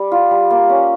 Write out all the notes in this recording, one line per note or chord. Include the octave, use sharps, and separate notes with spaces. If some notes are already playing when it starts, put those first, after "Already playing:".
Already playing: G3 D5
F4
G3
A#3
C#4